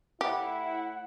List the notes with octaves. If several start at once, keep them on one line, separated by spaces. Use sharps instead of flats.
A2 E4 G4 F#5